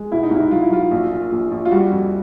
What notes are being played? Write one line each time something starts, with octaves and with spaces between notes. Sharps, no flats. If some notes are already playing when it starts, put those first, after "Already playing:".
Already playing: G#3
B2 E4
D#4
C2 E4
F#3 F4
E4
F#3 F4
A#1
A#2
A#1
A#1
F4
G3 F#4
F2